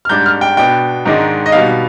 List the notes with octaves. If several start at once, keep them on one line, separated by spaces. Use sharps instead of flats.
F6
G#2 G3 D4 G6
F6
G5
B2 B3 D4 G5
G#2 D#3 G#3 D4
D#5
B2 G3 B3 D#4 F5